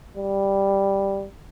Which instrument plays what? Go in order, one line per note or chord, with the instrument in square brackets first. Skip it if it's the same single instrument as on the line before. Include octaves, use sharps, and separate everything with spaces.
[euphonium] G3